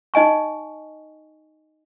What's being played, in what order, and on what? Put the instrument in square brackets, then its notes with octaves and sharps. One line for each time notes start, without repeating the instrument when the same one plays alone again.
[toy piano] D#4 D#5 G#5 C#6